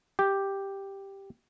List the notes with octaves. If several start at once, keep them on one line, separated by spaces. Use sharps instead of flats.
G4